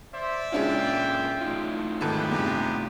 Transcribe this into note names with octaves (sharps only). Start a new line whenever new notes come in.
C5 D5 E5
A#2 G#3 C#4 D4 E4 F4 G5
A2 D#4 F4
G#2 D#3 G3 G#3 B3 G4 A4
E2 G2 C3